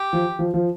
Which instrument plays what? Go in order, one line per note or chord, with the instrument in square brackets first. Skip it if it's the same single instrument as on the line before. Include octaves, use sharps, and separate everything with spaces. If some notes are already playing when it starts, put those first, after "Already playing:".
Already playing: [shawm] G4
[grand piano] F3
F3
F3